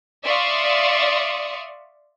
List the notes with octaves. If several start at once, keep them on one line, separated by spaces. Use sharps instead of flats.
D5 E5 F5 C6 C#6 D#6